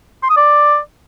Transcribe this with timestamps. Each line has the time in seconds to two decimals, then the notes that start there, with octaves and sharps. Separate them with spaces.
0.23 C6
0.30 D#6
0.37 D5